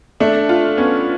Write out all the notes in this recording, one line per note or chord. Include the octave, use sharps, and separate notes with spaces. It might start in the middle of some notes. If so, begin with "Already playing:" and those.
A3 D4
F4
B3 C#4